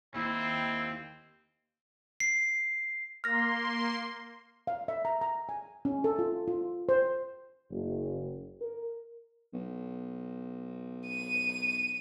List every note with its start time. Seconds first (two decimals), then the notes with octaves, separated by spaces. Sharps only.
0.15 D#2 C4 E4
2.20 C7
3.24 A#3 C6 F6 A#6
4.67 F5
4.88 E5
5.05 A#5
5.21 A#5
5.49 G#5
5.85 C#4
6.04 A4
6.19 F4
6.48 F4
6.89 C5
7.71 F#1
8.62 A#4
9.54 B1
11.08 D#7